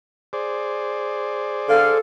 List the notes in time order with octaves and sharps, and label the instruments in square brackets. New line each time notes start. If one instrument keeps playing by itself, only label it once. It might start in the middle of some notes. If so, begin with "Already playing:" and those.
[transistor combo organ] G#4 C5 D5
[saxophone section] D3 F5 [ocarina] A4